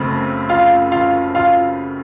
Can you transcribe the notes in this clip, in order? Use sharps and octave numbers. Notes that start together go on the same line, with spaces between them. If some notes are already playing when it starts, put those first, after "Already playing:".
Already playing: F#1 F#2 C#3 A3 C4
F4 F5
F4 F5
F4 F5